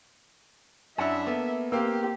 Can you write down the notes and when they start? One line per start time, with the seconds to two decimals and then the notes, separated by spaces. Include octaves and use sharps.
0.98 F#2 D4 E4 E5 F#5 G5
1.27 A#3 B3 A4
1.72 A#3 C4 G4 F5 G5 E6